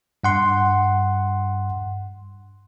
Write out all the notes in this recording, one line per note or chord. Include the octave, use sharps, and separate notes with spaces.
G2 F#5 C6